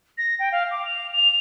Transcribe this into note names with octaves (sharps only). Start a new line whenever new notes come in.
A#6
G5
F5
D6
F7
F7